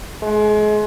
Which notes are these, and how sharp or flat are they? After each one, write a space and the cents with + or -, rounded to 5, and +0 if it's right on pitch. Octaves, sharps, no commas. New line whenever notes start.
G#3 +30